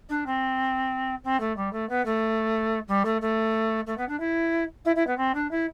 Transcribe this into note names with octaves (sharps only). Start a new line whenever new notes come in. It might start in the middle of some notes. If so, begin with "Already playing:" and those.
D4
C4
C4
A3
G3
A3
B3
A3
G3
A3
A3
A3
B3
D4
E4
E4
E4
B3
C4
D4
E4